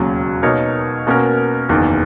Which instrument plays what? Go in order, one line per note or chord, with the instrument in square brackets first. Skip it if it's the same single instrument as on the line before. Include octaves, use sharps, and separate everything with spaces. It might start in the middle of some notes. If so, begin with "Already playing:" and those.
Already playing: [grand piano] E1 D#2 C#3 F#3 C#4
B2 A#3 D#4 A#4 C#5
B2 A#3 C#4 F#4 A#4
F#1 E2 D#3 A#3